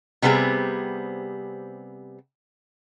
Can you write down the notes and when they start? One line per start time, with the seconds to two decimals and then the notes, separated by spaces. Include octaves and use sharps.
0.22 C3 G3 B3 C4 G#4